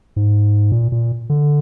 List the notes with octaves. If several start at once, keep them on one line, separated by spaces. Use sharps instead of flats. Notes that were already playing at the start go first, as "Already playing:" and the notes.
G#2
A#2
A#2
D3